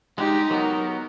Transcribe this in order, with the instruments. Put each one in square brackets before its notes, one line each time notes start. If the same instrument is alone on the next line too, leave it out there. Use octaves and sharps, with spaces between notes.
[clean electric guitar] G#3 [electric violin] D#4 [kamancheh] G4
[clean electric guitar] F#3 B3 [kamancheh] A#4